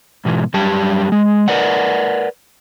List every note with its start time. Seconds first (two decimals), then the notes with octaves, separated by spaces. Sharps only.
0.25 G#2 B2 E3
0.54 F#2 G3 G4 A5
1.12 G#3
1.48 A#4 B4 D5 F#5